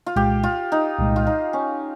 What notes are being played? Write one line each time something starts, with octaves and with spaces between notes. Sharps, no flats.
F4
C2 A#2 G#3 G4
F4
D#4
C2 A#2 G#3
F4
D#4
C#4